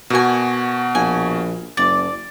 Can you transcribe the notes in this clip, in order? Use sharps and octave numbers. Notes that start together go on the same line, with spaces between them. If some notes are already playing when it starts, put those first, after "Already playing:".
B2 A#3 F#4 G#5
A#1 G#5
F#1 D5 A6